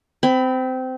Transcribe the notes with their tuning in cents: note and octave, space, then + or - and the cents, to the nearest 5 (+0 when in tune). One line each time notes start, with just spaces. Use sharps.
C4 -20 B5 +20